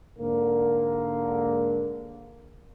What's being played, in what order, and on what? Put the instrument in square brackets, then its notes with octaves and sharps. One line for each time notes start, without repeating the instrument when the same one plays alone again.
[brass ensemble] G#2 D3 A#3